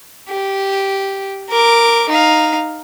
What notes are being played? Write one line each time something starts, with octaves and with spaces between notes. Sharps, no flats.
G4
A#4 D6
D#4 F5